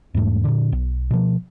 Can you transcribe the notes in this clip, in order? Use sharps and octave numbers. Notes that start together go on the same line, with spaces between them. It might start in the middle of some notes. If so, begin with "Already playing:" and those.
E2 G#2 A3
A#2 D3
B1
B2 F3